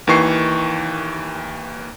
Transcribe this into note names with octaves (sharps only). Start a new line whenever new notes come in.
D#2 D#3 E3 C#6 C7